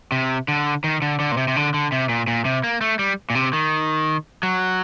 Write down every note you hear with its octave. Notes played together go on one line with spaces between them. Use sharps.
C3
D3
D#3
D3
D3
A#2
C3
C3
D3
D3
C3
A#2
A#2
C3
A#3
A3
G3
A#2
C3
D#3
F#3